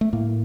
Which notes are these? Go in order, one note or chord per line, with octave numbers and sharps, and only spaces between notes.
A3
A2 A#3